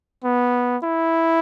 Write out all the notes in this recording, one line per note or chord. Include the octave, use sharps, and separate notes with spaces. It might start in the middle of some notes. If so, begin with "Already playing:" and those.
B3
E4